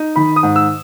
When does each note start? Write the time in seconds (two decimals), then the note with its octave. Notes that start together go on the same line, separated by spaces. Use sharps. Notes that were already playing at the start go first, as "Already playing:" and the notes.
Already playing: D#4
0.16 D#3 B5
0.36 D#6
0.43 G#2
0.56 E6